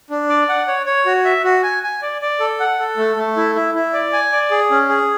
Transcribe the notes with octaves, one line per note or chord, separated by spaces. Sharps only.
D4
D5
F#5
C#5
C#5
F#4
E5
F#4
G#5
G#5
D5
D5
A4
F#5
A4
A3
A3
E4
E4
E4
D5
G#5
D5
G#4
C#4
G#4